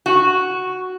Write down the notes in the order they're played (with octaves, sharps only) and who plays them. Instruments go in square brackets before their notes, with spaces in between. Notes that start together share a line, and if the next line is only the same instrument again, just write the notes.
[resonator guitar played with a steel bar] F#4